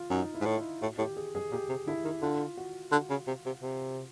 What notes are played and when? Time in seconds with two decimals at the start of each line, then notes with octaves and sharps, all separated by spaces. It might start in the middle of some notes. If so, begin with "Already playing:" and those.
Already playing: F4
0.11 F#2 D#4
0.34 E4
0.41 G#2
0.46 A2
0.58 E4
0.81 A2 F#4
0.98 A2 G4
1.16 G#4
1.34 F#2 G#4
1.51 A#2 G4
1.69 C3
1.87 D3 E4
2.05 D#3
2.22 D3 F4
2.57 F#4
2.92 D3 F#4
3.10 C#3
3.27 C3
3.46 C3
3.62 C3